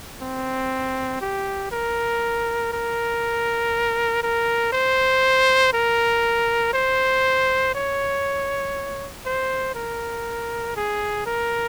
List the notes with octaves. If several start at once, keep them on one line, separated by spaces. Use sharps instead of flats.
C4
G4
A#4
A#4
A#4
C5
A#4
C5
C#5
C5
A#4
G#4
A#4